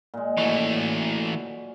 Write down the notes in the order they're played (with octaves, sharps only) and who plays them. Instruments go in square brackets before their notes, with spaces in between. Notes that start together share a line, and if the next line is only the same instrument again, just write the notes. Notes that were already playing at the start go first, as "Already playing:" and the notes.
[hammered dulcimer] A#2 G#3
[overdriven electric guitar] E3 A3 [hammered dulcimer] F#3 C#6